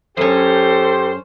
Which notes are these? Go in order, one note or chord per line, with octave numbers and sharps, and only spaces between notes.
F#2 C#4 G4 A4 C5